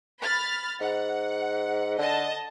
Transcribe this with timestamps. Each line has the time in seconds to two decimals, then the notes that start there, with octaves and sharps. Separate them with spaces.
0.22 B5 F6 A6
0.81 G#2 F#5
1.99 D3 D#5 A5